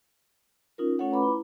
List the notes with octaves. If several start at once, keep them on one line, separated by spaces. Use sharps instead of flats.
C#4 D#4 F4 A#4
A3 C#4 F4 A4 C#5 F#5
B4 A#5 B5 D6
E4